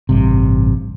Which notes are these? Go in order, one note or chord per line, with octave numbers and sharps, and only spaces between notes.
A1 G2 C3